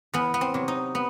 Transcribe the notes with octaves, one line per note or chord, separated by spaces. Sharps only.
E2 B3
B3
C4
C3 F#3
D#4
B3